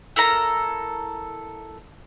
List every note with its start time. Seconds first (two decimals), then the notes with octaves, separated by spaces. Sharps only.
0.16 E4 A4 A#4 A#5